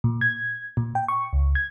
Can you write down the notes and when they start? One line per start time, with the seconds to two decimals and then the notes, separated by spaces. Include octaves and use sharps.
0.04 A#2
0.21 G#6
0.77 A#2
0.95 G5
1.08 C#6
1.33 C#2
1.55 G#6